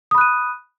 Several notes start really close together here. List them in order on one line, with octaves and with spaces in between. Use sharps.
D#6 B5 F#6 D#7